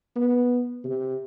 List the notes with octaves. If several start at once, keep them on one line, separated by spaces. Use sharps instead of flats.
B3
C3